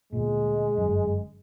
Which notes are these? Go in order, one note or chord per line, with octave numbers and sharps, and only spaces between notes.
D2 A#2 G#3
G1 F#2